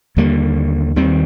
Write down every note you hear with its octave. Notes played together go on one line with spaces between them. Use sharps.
D#2 D3 G3 A#3
D#2 D#3 G3 C4